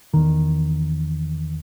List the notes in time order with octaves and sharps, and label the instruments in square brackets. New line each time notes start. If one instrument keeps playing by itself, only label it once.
[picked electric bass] E2 D#3